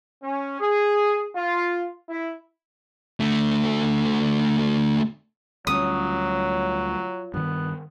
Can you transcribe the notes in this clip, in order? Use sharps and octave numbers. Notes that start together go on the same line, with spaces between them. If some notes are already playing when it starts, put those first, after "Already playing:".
C#4
G#4
F4
E4
D3 A3
D2 F#3 G3 C#4 F4 C#5 D#6
G2 D#3 B3